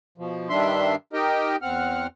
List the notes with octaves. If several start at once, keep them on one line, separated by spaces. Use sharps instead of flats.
B2 F3
G2 D#3 G3 D4 E5 C6
D#4 G4 A#4 D#5 G5
E2 C4 F#5 F6